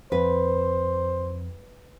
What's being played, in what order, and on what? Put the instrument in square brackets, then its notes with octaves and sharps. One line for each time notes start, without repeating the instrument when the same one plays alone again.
[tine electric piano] F2 [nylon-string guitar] B4 [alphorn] C5